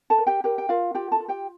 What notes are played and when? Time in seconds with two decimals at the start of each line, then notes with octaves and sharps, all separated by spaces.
0.10 A4 A5
0.18 A#4
0.27 G4 G5
0.44 G4 A#4 G5
0.58 G5
0.69 F4 A#4 F5
0.94 F4 G4 G5
1.12 A4 A5
1.20 F4
1.28 G4 G5